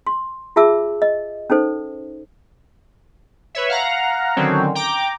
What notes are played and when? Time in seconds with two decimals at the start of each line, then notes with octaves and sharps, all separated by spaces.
0.07 C6
0.56 F4 G#4 E5 A5 D6 E6
1.02 D#5
1.50 C#4 D#4 A4 C5
3.55 B4 C#5 E5
3.69 F5 F#5 A#5
4.36 D3 D#3 F#3 C4 C#4
4.75 G5 A#5 D6